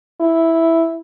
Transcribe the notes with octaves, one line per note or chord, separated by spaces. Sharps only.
E4